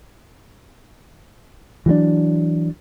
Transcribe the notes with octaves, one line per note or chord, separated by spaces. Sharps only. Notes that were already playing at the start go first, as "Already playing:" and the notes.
E3 F#3 G#3 D4